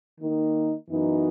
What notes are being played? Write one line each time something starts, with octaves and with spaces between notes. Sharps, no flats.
D#3 A#3 D#4
F#2 E3 B3 D#4 F#4